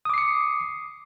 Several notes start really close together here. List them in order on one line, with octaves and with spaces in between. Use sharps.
D#6 D6 C7 C#7